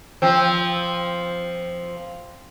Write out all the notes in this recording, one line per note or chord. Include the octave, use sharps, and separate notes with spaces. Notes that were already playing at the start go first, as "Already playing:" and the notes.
F3 C4